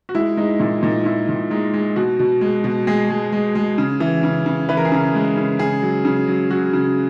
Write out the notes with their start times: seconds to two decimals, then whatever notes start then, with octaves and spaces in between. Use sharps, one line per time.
0.09 F#4
0.15 G#3 E4
0.37 G#3 D#4
0.60 A#2 E4
0.83 A#2 D#4
1.05 A#2 E4
1.29 A#2
1.51 G#3 D#4
1.74 G#3
1.96 B2 F#4
2.19 B2
2.41 G#3
2.64 B2
2.87 G#3 G#4
3.10 G#3
3.32 G#3
3.55 G#3
3.78 C#3
4.00 E3
4.23 C#3
4.46 C#3
4.69 E3 B4
4.77 A#4
4.85 G#4
4.92 C#3 A#4
5.15 G#3
5.37 C#3
5.59 C#3 G#4
5.83 F#3
6.05 C#3
6.28 F#3
6.50 F#3 F#4
6.73 C#3